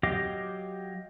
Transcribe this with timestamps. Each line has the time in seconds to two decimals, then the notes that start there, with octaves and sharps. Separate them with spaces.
0.03 F#3 G4 D#5 F5 D6